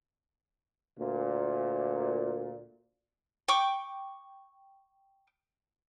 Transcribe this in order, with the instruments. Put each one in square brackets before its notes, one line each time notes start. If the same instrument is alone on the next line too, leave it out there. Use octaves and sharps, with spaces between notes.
[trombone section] D2 A#2
[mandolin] G5 C#6 D6